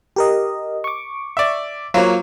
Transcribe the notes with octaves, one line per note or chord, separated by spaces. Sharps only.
G4 A#4 D#5
C#6 D6
D5 E5
F#3 A#3 F4 C5 C#5